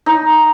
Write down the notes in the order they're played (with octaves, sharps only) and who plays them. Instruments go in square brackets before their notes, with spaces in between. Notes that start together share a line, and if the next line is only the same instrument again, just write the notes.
[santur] D#4